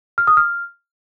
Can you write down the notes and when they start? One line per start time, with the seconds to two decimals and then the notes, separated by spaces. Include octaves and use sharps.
0.18 F6
0.27 D#6
0.37 F6